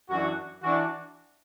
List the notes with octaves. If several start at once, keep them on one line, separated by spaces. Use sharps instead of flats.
F#2 E3 D4 F#4
E3 D4 F#4